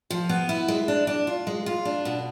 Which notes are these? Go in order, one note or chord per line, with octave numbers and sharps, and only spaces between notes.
F3
B3
E4
G#3
D4
D4
F4
G#3
F4
D4
B2